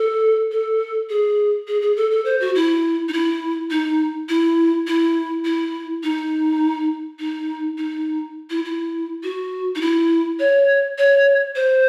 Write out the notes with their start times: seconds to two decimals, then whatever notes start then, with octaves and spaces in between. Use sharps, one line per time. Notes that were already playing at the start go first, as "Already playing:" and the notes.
Already playing: A4
0.52 A4
1.10 G#4
1.67 G#4
1.82 G#4
1.97 A4
2.11 A4
2.25 C5
2.40 F#4
2.55 E4
3.09 D#4
3.13 E4
3.71 D#4
4.29 E4
4.87 E4
5.45 E4
6.03 D#4
7.19 D#4
7.78 D#4
8.50 E4
8.65 E4
9.23 F#4
9.75 D#4
9.81 E4
10.40 C#5
10.98 C#5
11.56 C5